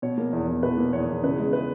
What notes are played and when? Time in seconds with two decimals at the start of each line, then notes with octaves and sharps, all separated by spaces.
0.02 B2 C#5
0.18 A#3
0.33 E2
0.48 E2
0.63 B2 B4
0.77 A#3
0.93 E2 C#5
1.08 E2
1.23 C#3 B4
1.39 G#3
1.53 B4